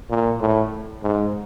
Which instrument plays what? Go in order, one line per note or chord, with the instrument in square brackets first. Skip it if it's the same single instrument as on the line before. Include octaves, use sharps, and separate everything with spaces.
[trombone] A#2
A2
G#2